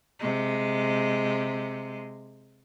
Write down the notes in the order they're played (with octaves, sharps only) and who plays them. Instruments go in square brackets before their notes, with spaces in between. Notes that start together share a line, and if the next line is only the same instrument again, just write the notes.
[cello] C3 G#3